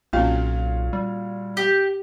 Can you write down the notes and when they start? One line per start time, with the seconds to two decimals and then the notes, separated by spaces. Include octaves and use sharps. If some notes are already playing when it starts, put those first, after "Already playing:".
0.13 B1 A#2 A#3 C4 C#4 F#4 F5
0.93 G3
1.57 G4